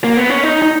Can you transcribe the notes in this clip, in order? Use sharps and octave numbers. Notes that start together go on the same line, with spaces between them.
A#3
B3
C#4
D#4
D#4